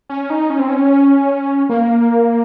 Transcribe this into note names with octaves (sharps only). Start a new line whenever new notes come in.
C#4
D#4
C#4
C4
C#4
A#3